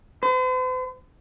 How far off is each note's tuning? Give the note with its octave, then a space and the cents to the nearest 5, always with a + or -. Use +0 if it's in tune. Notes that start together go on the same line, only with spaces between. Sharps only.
C5 -45